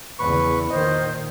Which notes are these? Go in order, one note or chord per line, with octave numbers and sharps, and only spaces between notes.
E2 C#3 B4 C#6
A#2 D#3 C5 D#5